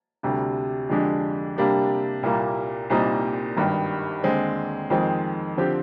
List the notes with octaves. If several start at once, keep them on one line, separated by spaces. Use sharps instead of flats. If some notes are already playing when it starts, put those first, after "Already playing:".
D2 C3 G3 D4
F2 D3 G#3 D4 G4
C3 G3 A#3 D4 G4
C2 A#2 G3 A#3
C2 A#2 G3 C4 D#4
G#1 G2 D#3
D#2 D3 G#3 C4
F2 D#3 G#3 C4
D3 F3 C4 G4